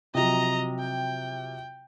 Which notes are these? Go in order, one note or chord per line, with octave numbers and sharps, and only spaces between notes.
C3 F3 F#3 D#5 A#5
G5